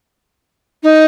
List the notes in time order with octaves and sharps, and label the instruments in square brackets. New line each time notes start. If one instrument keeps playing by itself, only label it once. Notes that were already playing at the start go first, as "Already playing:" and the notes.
[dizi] D#4